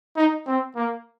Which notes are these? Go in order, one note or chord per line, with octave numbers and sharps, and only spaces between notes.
D#4
C4
A#3